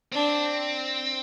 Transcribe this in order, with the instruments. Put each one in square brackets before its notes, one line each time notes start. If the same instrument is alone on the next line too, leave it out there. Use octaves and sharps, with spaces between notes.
[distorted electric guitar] C4 [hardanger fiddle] D4